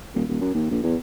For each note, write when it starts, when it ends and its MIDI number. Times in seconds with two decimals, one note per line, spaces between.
0.14 0.23 27
0.29 0.41 27
0.41 0.53 42
0.54 0.71 39
0.71 0.80 34
0.84 0.96 40